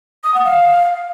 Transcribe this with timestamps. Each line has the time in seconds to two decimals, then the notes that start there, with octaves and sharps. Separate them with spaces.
0.24 D#6
0.34 F#5
0.45 F5